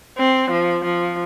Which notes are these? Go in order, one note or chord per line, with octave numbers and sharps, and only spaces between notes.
C4
F3
F3